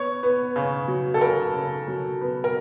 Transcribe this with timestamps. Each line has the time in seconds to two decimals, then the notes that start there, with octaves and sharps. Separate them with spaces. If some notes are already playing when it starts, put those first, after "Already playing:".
Already playing: B3 C#5
0.23 B3
0.56 C#3
0.88 F#3
1.14 A4
1.21 C#3 A#4
1.54 C#3
1.88 F#3
2.21 B3
2.44 A#4